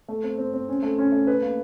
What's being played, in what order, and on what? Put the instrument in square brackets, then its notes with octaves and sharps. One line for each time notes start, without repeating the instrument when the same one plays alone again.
[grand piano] A3
C4
C4
C4
C#4
A3
C#4
A3
B4
A#3